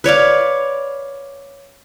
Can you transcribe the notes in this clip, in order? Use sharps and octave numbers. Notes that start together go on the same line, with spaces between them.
B4 C#5 D5 F5